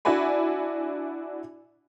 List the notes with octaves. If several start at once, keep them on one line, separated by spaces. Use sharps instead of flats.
D4 E4 F#4 D5 G#5 B5